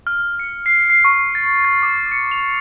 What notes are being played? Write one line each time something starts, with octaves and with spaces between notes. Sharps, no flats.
F6
C#7
C7
C7
C#6
A6
A6
D6
C#7
F7